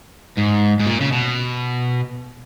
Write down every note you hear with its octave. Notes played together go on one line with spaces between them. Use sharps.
G#2
G#2
A#2
C#3
B2